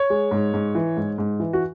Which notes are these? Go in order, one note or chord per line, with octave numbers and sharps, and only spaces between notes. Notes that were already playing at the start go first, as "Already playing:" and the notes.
Already playing: C#5
G#3
G#2
G#2
E3
G#2
G#2
E3
F#4